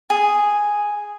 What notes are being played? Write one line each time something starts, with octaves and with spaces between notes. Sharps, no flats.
G#4